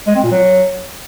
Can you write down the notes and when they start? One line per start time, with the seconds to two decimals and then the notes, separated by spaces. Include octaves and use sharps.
0.07 G#3
0.15 C4
0.23 A#2
0.31 F#3